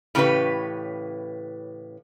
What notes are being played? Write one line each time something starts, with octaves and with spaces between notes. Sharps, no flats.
A2 C#3 E3 C#4 G4 B4